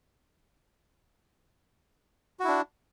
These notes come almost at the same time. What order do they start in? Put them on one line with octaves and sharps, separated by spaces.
F#4 E4 D4